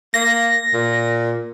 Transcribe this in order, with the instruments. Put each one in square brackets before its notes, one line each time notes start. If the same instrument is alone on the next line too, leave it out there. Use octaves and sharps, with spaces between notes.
[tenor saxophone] A#3 [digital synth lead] A#6
[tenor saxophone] A#2